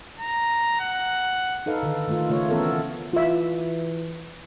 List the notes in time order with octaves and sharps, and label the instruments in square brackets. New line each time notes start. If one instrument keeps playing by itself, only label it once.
[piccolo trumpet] A#5
F#5
[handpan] D#4 A4 B4 F5
D3 D#3 A4
D#3 A3 F4
C#3 A3 F4 C#5
E3 B3 C#4 A4 A#4
[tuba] E3 [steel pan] F4 E5